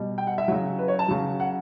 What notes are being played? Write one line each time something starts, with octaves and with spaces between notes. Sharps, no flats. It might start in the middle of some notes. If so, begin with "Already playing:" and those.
Already playing: B2 G3
G5
F#5
E5
C#3 F#3
B4
C#5
A5
C#3 F#3
F#5